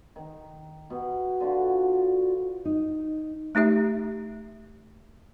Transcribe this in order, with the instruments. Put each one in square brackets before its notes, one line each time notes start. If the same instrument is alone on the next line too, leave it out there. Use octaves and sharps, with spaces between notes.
[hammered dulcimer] D#3
B2
D3 F4 F#4
[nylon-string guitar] D#4
[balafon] A3 D#4 G4 E5